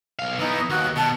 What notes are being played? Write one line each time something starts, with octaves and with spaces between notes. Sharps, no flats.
B1 F5
E3 B3 D#4
D#2 F#4
B2 A5